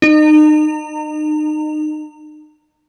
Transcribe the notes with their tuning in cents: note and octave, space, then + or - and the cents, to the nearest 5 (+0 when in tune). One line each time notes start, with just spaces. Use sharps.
D#4 -35